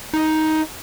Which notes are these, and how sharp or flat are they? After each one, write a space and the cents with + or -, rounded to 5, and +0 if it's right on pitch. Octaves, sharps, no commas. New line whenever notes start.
D#4 +10